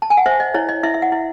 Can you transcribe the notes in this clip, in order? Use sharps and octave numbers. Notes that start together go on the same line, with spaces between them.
A5
G#5
F#5
C5 E5
D#5
E4 C#5
D#5
E4 E5
E5
F#5
E4